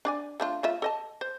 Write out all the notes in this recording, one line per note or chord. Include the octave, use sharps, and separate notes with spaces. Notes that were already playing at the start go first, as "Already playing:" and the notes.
D4 D5 G#5
A3 D4 F4
A3 F4 E5
A4 D#5 A5
C5